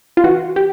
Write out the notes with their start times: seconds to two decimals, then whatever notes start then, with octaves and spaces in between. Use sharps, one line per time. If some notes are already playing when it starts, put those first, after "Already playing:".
0.17 F4
0.24 E3 F#4
0.56 G4